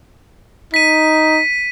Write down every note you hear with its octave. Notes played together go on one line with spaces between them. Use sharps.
D#4 B6 D#7